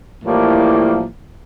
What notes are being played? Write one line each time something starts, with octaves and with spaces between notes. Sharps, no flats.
A2 E3 F3 G3 A#3